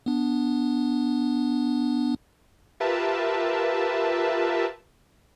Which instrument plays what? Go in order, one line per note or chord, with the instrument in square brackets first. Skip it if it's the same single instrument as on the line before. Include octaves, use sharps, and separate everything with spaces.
[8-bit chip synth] B3 D4
[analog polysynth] F4 G4 A#4 B4 E5 A5